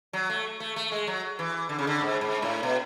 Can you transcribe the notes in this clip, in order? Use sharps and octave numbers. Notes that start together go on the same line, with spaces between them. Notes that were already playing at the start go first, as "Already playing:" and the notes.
F#3
A3
A3
A3
G#3
F#3
E3
D3
C#3
D3
G#2
G#2
A2
B2